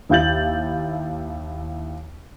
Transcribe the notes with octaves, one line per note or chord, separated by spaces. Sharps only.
D#2 E4 F5 G6 A6 F#7